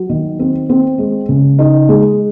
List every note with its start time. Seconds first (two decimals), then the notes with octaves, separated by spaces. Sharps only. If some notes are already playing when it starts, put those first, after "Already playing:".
Already playing: F#3
0.09 D#3
0.39 C4
0.69 C4
0.98 G#3
1.29 C#3
1.59 D#4
1.88 G#3